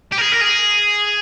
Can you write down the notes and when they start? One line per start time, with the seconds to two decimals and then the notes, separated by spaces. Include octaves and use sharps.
0.12 G4
0.18 A#4
0.21 G#4
0.32 A#4
0.41 G#4